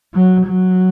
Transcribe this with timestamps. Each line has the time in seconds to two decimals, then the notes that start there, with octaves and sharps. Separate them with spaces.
0.14 F#3
0.46 F#3